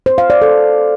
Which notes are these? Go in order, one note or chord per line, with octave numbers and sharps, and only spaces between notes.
C5
F5
D5
A4